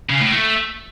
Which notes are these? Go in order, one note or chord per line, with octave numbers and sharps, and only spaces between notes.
C#3
A2
A3